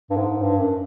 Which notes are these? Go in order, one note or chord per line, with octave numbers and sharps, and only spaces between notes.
G2
G#2
G2
F#2